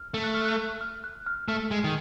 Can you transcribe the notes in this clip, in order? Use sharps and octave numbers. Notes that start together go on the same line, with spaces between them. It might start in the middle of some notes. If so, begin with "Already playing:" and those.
Already playing: F6
A3
F#6
F6
F#6
F6
F#6
F6
A3 F6
G#3
D#3